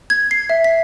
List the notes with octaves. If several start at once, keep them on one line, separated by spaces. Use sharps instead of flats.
G#6
C7
E5
B6